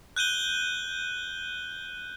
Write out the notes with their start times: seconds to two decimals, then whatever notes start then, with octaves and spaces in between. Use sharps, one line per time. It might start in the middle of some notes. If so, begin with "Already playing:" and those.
0.16 F#6 G6 D#7 G7